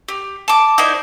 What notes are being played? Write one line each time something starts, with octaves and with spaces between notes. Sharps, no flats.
G4
A5 D6
D#4 E4 C5 D5